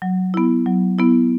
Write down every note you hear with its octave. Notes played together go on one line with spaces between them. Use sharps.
F#3
B3 E4
F#3
B3 E4